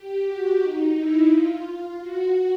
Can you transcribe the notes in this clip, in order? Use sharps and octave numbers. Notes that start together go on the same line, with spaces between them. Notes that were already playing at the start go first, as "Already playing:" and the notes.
Already playing: G4
F#4
D#4
E4
F4
F#4